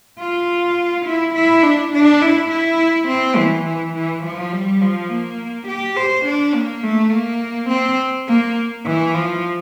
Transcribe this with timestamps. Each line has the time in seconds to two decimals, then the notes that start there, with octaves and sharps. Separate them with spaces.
0.19 F4
1.06 E4
1.35 E4
1.63 D4
1.92 D4
2.22 E4
2.50 E4
3.07 C4
3.36 E3
3.65 E3
3.94 E3
4.23 F3
4.52 G3
4.81 F3
5.10 A#3
5.68 G4
5.97 C5
6.25 D4
6.54 A#3
6.83 A3
7.12 A#3
7.69 C4
8.27 A#3
8.85 E3
9.14 F3